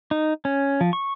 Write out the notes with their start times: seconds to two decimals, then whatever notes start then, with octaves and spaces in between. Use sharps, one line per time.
0.11 D#4
0.45 C#4
0.81 F3
0.93 C#6